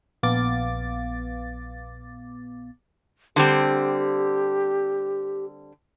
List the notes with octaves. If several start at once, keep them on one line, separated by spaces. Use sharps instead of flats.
A#1 B3 F5 D6 A6
D3 G3 C4 G4